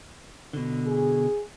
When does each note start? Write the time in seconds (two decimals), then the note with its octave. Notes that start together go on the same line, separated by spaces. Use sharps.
0.53 B2 D3
0.86 G#4